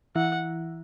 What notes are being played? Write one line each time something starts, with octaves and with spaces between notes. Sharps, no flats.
E3 E4 F#5